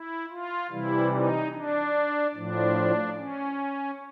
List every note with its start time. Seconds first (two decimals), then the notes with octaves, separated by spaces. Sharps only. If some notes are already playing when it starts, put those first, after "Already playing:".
Already playing: E4
0.30 F4
0.71 C3 E3 G3 E4
1.11 D#4
1.53 D4
2.34 A2 F3 D4
3.17 C#4